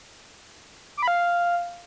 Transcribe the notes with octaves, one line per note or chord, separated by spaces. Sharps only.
D6
B5
F5